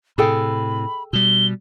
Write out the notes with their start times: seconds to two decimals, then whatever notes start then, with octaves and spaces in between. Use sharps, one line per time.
0.18 A2 C3 G#4 A4 G5 B5
1.13 B2 G3 G7